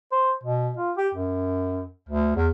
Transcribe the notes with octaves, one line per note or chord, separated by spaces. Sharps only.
C5
B2
F4
G4
F#2
D2
E2